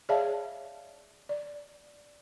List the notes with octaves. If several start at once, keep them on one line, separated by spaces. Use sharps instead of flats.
G#4 C#5 D5 E5 F5 A5
D5